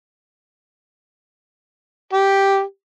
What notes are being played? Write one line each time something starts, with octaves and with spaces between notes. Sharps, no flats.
G4